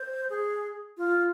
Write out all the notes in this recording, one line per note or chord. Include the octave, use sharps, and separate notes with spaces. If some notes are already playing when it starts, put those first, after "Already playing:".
Already playing: C5
G#4
F4